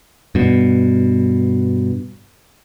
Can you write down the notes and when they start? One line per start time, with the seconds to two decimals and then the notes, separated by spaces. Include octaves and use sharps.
0.35 G2 B2